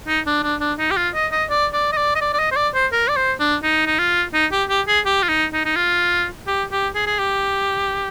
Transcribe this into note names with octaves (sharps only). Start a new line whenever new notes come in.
D#4
D4
D4
D4
D#4
G4
F4
D#5
D#5
D5
D5
D#5
D5
D#5
D5
D5
D#5
C5
D5
C5
A#4
D5
C5
D4
D#4
D#4
F4
D#4
G4
G4
G#4
G4
F4
D#4
D#4
D#4
F4
G4
G4
G#4
G#4
G4